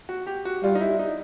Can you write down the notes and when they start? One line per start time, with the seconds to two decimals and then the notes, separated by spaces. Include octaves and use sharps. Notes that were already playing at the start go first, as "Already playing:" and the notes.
0.09 F#4
0.27 G4
0.45 F#4
0.63 G3 F4
0.75 D#4
0.81 E4
0.99 D#4